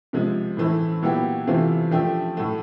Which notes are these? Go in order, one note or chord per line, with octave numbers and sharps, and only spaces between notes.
C3 F3 G#3
A2 E3 A3 C4 E4
A#2 F#3 B3 E4 G4
C3 E3 A3 C4 F4
F3 A3 D4 G4
A2 F#3 A3